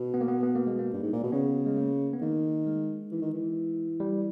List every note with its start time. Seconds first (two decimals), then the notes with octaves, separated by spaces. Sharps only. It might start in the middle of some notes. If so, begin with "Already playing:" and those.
Already playing: B2
0.14 B3
0.21 A#3
0.28 B3
0.43 B3
0.55 A#3
0.67 G#3
0.79 A#3
0.93 G2
1.03 G#2
1.13 A#2
1.23 B2
1.32 C#3 B3
1.66 G#3
1.77 A#3
2.13 B3
2.22 D#3 A#3
2.67 G#3
3.11 E3
3.22 D#3
3.33 E3
4.00 G3